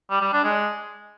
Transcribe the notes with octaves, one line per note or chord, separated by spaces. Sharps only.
G3
G3
D4
G#3